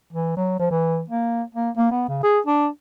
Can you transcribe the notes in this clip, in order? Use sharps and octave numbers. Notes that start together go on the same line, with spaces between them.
E3
F#3
F3
E3
A#3
A#3
A#3
B3
C#3
G#4
D4